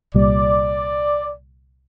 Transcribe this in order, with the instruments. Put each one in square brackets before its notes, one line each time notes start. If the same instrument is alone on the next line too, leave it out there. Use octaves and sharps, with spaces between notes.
[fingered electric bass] C2 A#2 G3 [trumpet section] D5